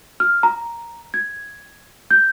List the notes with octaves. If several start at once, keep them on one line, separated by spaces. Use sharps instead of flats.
F6
A#5
G#6
G6